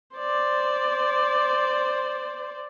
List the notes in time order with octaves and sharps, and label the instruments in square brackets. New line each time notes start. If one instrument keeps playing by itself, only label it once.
[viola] C5 D5